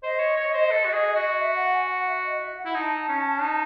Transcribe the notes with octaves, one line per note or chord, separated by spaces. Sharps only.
C5 D#5
C#5
C#5
C5
A4
F#4
G#4
F#4
E5
F#5
G#5
F#5
E5
D#5
E5
F#5
E4
D#4 A5
C#4
D#4